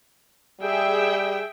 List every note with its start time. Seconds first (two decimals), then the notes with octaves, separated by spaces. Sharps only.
0.61 G3 G#4 E5 G5